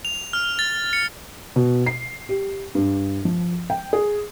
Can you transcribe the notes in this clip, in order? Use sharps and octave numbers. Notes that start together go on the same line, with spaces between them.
F7
F6
A6
C#7
B2
C7
G4
G2
F3
G5
G#4